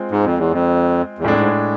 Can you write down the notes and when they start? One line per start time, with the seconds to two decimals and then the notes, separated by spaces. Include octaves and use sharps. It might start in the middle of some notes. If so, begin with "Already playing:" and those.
Already playing: G#3 C4 F4
0.11 G#2
0.25 F2
0.38 E2
0.52 F2
1.19 E2
1.24 F2 A2 G#3 D4
1.39 G#2